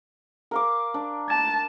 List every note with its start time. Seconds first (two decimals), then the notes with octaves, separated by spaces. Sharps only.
0.51 A#4 F5 D6
0.94 D4
1.29 A5